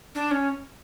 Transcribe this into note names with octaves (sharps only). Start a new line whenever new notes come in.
D4
C#4